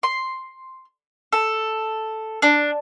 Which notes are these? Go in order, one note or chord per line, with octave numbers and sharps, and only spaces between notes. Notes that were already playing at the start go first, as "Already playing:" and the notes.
C6
A4
D4